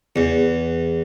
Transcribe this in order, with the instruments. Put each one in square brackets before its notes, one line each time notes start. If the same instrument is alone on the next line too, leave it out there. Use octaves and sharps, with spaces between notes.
[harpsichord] E2